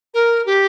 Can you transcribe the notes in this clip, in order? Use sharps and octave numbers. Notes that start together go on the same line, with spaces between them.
A#4
G4